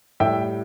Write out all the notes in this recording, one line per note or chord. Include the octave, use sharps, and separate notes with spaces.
A2 G3 E5 G5